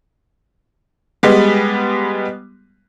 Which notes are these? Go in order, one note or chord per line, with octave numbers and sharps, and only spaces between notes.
G3 G#3 B3